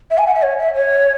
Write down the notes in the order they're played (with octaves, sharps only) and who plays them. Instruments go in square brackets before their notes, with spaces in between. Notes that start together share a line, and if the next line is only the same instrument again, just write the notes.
[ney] E5
G#5
F#5
E5
C#5
E5
C#5